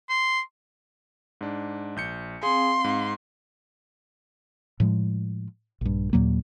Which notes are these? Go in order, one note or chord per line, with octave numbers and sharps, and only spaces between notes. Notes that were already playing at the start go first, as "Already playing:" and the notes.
C6
G#2 D4
A#1 G6 C#7
C4 G#4 F5 C6
G#2
A2 F3 G#3
A#1 G2
D#2 A#2 F#3 A#3